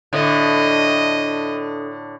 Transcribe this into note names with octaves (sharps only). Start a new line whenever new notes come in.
A2 D3 D4 A4 D#5 D#6